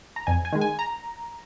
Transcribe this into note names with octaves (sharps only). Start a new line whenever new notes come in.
A#5
F2 G#5
G#5
D#3 G#3
G#5
A#5